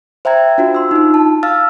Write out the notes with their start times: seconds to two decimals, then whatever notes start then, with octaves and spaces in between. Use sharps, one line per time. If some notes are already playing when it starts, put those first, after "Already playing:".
0.25 C5 E5 G5 A#5 G#6
0.58 D4 F4 F#4
0.75 C6 E6
0.91 D#4 F4
1.14 A5
1.43 F5 E6 F6 A6